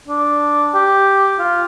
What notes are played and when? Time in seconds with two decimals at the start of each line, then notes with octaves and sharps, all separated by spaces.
0.08 D4
0.74 G4
1.39 F4